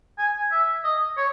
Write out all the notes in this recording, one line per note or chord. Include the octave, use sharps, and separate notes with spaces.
G#5
E5
D#5
C#5